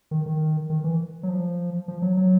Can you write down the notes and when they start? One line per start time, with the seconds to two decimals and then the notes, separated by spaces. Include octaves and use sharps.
0.11 D#3
0.26 D#3
0.70 D#3
0.84 E3
1.23 F#3
1.29 F3
1.88 F3
2.02 F#3
2.17 F#3